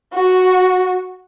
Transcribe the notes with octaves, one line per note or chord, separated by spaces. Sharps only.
F#4